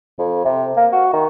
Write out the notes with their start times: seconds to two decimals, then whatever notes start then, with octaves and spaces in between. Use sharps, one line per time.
0.19 F2
0.44 C3
0.77 A#3
0.92 F#4
1.13 D#3